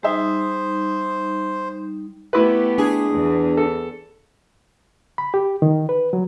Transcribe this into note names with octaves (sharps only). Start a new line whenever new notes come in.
G3 D#4 G#4 C5 E5
A3 B3 E4 G4 B4
D4 G#4
E2
A4
B5
G4
D#3
B4
F#3